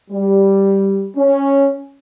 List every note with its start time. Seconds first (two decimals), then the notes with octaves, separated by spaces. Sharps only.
0.11 G3
1.16 C#4